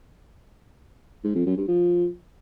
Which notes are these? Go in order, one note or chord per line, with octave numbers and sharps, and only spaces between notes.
G#2
F2
F#2
G2
F3